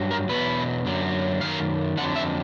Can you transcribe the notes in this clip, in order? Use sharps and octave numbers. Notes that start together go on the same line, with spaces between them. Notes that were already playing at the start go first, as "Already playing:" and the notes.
Already playing: G2 F#3
A#4
E2 B2 F#3 B4
F#2 D3 F#3
F#2 D#3 F5
F2 D3 F#3 F#5
E5